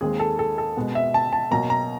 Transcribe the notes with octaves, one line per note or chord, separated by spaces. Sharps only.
D#2 D#3 G#3 C4 G#4
A4
A4
A4
B2 G#3 B3
E5
A5
A5
B2 F#3 A#3 A#5
A#5